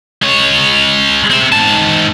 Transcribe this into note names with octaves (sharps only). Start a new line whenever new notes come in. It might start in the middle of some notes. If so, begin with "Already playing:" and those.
G#3 C#5
C4 E5
G#2 A5